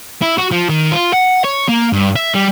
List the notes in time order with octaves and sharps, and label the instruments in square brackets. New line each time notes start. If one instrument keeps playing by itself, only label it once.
[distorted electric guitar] E4
F#4
F3
D#3
F4
F#5
C#5
A#3
G2
E5
G3